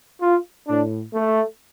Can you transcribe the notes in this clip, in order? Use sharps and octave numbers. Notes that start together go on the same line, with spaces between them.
F4
A2 D4
A3